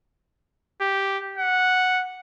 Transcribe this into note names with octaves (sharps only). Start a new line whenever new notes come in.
G4
F#5